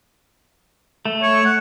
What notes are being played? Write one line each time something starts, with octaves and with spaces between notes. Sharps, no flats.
A3
C#5
F#5